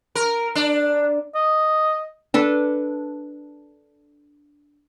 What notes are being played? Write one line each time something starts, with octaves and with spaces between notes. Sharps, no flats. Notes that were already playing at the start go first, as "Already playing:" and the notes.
A#4
D4
D#5
D4 A4 B4